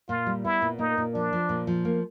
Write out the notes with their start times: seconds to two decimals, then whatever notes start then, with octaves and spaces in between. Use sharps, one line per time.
0.09 A#2 F4
0.27 G3
0.44 B3 E4
0.62 A#2
0.79 A#3 D#4
0.98 A#2
1.14 F3 D4
1.33 F3
1.49 A#2
1.67 F3
1.85 A#3